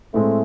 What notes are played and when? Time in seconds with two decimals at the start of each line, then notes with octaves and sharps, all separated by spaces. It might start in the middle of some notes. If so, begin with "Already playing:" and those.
0.14 A2 G#3 A3 C4